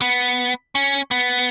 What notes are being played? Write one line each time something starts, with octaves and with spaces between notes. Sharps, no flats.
B3
C#4
B3